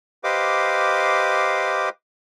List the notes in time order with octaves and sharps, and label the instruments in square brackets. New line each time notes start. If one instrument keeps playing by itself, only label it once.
[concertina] G4 B4 C5 D#5 F5 D6